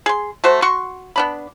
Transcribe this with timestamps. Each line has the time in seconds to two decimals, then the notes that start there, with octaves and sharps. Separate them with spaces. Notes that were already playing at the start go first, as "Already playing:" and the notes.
0.06 G#4 C6
0.44 A3 F#4 C5
0.62 F#4 F#5 C6 C#6
1.16 B3 D4 B5